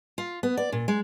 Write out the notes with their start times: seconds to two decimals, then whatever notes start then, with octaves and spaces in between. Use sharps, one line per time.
0.18 F4
0.43 B3
0.57 D5
0.72 A#2
0.88 G#3